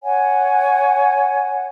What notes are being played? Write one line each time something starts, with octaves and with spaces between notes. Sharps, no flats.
C#5 F#5 G#5